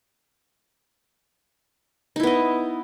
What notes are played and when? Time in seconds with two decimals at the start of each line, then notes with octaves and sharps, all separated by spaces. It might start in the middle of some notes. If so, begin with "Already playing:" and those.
2.16 D#4
2.20 E4
2.23 B3
2.27 D#5